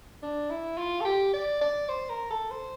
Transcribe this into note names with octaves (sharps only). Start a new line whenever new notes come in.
D4
E4
F4
A4
G4
D5
D5
C5
A#4
A4
C5